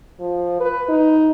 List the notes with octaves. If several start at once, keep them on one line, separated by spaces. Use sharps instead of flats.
F3
B4
D#4